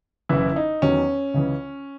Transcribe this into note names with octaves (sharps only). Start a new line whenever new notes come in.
F#1 F#2 E3 E4
D#4
E2 D#3 F#3 C#4
C#2 C#3 E3